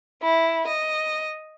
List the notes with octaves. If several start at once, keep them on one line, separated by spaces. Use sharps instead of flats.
E4
D#5